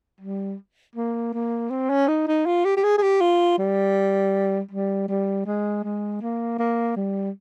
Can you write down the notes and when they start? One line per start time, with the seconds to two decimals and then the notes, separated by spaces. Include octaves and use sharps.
0.21 G3
0.96 A#3
1.33 A#3
1.70 C4
1.90 C#4
2.08 D#4
2.27 D#4
2.46 F4
2.65 G4
2.76 G4
2.84 G#4
2.98 G#4
3.02 G4
3.21 F4
3.58 G3
4.71 G3
5.08 G3
5.46 G#3
5.84 G#3
6.21 A#3
6.59 A#3
6.96 G3